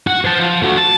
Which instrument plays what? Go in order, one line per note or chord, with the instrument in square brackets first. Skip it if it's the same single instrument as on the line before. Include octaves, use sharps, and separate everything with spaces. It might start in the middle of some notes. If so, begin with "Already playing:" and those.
[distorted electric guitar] F#4
C5 A5
F3
A3 F#4
A5